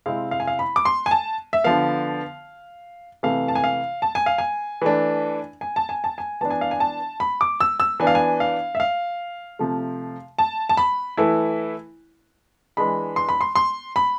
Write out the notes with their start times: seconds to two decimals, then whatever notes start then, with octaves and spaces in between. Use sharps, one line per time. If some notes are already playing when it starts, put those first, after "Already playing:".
0.06 C3 G#3 C4 E4 F5
0.31 F5
0.40 G#5
0.47 F5
0.59 B5
0.76 D6
0.85 C6
1.06 G#5
1.11 A5
1.53 E5
1.64 D3 F3 B3 F5
3.23 C3 E3 A3 F5
3.48 A5
3.55 G#5
3.64 F5
4.02 A5
4.15 G#5
4.26 F5
4.38 G#5
4.82 E3 A3 D4
5.61 G#5
5.76 A5
5.89 G#5
6.04 A5
6.18 G#5
6.41 E3 B3 D4 A5
6.50 G#5
6.61 F5
6.71 G#5
6.80 A5
7.20 B5
7.41 D6
7.60 E6
7.80 E6
8.00 E3 B3 D4 G#5
8.07 F5
8.15 G#5
8.40 F5
8.75 E5
8.80 F5
9.59 C3 F3 A3
10.39 A5
10.69 A5
10.77 B5
11.17 E3 A3 E4
12.77 E3 G#3 D4 B5
13.16 C6
13.29 B5
13.41 C6
13.55 C6
13.96 B5